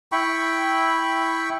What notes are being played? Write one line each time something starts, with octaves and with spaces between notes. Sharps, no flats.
E4 G5 B5 C#6